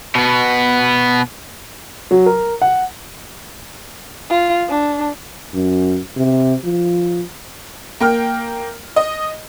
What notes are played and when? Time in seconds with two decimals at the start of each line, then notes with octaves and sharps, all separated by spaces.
0.15 B2 B3
2.11 F#3
2.26 A#4
2.62 F#5
4.30 F4
4.69 D4
5.54 F#2
6.17 C3
6.64 F3
8.00 A#3 G5 F6
8.96 D#5